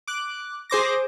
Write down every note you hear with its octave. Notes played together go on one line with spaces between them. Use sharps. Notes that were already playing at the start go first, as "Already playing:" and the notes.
D6 F#6
G#4 C5 D6 A#6